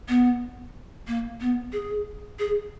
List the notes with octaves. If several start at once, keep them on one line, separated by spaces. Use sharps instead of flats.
B3
A#3
B3
G#4
G#4